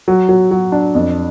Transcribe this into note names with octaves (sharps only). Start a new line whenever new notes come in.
F#3
F#3
F#3
D4
F2